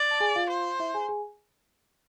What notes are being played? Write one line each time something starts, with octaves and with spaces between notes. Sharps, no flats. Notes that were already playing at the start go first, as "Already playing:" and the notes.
Already playing: D5
A5
G#4 G#5
F4 F5
C5
E4 E5
G#4 G#5
G#4 G#5